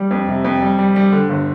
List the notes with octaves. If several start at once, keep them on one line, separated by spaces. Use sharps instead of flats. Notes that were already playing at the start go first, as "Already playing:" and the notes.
Already playing: G3
F2
C3
F2
G3
G3
G3
D3
G1